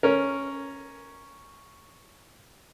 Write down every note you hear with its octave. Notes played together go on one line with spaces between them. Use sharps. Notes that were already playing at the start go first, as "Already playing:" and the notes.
C#4 A#4